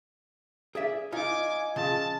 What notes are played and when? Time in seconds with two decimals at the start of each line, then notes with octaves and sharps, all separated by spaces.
0.75 G#4 D5 E5
1.12 D#4 F4 D#5 G#5 D6
1.76 C#3 F3 A5 E6